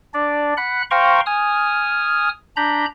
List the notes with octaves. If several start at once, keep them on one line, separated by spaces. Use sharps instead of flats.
D4 D5
F#5 B5 F#6
C5 F5 G5 A#5 C6 C#6
G#5 D#6 F6
D4 A#5 B5 G6